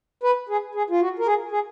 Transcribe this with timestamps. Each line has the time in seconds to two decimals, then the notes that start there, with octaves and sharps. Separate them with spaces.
0.23 B4
0.49 G#4
0.75 G#4
0.90 F4
1.01 F#4
1.19 A#4
1.26 G#4
1.52 G#4